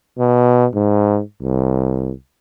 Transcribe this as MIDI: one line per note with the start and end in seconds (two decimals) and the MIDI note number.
0.19 0.66 47
0.75 1.20 44
1.42 2.12 36